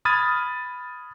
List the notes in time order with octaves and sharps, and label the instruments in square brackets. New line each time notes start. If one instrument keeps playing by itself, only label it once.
[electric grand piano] B5 D#6 F6 G#6 A6 D#7